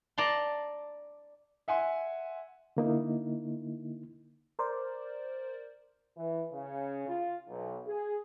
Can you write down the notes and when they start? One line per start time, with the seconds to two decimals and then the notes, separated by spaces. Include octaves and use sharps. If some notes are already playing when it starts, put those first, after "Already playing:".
0.18 D5 A5 A#5 C6
1.68 E5 F#5 G#5 C6
2.77 D3 A#3 D#4 E4
4.59 A#4 C5 D5
6.17 E3
6.52 C#3
7.08 F4
7.49 B1
7.87 G#4